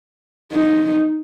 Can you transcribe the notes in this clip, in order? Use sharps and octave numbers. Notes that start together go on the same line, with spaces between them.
D#4